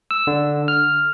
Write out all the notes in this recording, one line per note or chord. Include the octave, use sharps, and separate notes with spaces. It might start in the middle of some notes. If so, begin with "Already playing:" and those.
E6
D3
F6